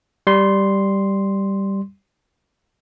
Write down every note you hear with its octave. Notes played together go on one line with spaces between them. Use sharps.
G3 C6